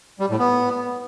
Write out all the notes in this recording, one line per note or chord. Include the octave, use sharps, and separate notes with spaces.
G3
A2
B3